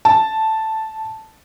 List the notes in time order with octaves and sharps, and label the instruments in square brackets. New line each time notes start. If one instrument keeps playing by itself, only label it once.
[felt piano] A5